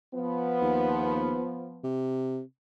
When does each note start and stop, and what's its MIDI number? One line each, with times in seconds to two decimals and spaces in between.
0.14 1.89 53
0.14 1.89 59
0.62 1.37 39
1.84 2.41 48